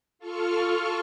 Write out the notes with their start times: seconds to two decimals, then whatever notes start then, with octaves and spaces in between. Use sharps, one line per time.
0.19 F4 A4 C#6 F6